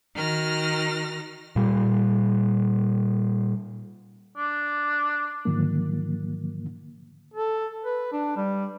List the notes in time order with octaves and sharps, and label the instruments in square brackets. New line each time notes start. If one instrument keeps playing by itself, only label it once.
[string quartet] D#3 F#4 F6 A#6
[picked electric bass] A#2 G3
[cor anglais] D4
[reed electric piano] G#2 D3 D#3 F3 F#3 A#3
[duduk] A4
B4
D4
G3